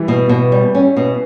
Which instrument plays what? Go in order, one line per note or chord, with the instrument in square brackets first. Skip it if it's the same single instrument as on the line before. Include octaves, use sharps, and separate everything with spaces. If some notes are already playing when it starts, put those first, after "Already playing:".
Already playing: [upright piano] E3 G3
[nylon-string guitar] B2
B2
G3
C#4
B2